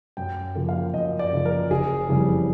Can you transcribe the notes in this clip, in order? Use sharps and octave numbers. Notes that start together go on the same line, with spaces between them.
F#2 G5
C#3 F3 A#3
F5
F#2 D#5
D5
C#3 F3 A#3
A#4
F#1 G#4
F2 C#3 E3 G3